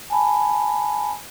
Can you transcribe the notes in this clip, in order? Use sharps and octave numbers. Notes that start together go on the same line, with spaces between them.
G#5 A5 B5